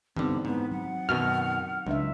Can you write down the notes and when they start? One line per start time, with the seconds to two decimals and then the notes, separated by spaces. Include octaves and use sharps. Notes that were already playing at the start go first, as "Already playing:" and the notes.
0.17 G2 D3 E3 B3 C4 D#4
0.45 G#2 B3
0.72 F#3 F#5
1.09 F#2 B2 D#3 F6
1.87 C#2 F#3 D4 E5